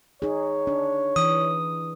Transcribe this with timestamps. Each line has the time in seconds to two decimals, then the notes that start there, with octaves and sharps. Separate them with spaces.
0.22 D#4 G#4 C#5
0.67 D4
1.16 E3 D#6